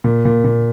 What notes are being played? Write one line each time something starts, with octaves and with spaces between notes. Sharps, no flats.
A#2
A#2
A#2